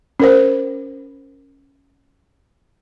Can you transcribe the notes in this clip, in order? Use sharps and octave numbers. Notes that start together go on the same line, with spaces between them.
C#4 A#4 C5